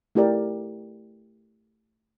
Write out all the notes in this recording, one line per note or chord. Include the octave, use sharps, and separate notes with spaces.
A3 E4 G4 A#4 D5